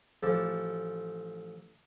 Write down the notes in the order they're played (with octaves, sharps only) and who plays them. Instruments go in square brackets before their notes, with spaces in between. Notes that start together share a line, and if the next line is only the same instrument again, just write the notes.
[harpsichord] A1 F3 A4 D6